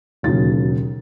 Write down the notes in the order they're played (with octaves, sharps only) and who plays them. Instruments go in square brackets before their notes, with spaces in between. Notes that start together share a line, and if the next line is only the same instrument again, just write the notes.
[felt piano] E1 D#2 C#3 F#3 A6